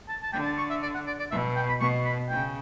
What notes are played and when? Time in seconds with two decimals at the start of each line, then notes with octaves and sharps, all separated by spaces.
0.09 A5
0.22 A5
0.33 D3 G5
0.45 A5
0.58 C#6
0.70 E5
0.82 D5
0.94 F#5
1.07 D5
1.19 D5
1.31 B2 E5
1.56 G5
1.68 B5
1.80 B2 C#6
2.05 B5
2.29 C#3 G5